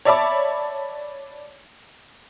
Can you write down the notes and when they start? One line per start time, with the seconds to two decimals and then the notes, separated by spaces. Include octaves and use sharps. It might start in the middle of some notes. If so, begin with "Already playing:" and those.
0.05 C#5 D5 E5 A5 B5 D6